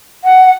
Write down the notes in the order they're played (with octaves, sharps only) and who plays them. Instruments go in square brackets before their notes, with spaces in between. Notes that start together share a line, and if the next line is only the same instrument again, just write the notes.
[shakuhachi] F#5